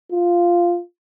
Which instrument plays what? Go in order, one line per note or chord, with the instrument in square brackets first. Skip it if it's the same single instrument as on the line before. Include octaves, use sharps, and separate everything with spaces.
[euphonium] F4